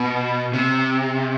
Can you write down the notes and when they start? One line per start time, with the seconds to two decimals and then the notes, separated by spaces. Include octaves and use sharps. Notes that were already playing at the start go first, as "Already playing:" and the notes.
Already playing: B2
0.53 C3